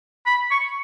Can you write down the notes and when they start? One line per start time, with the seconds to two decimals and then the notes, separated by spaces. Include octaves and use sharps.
0.26 B5
0.51 C#6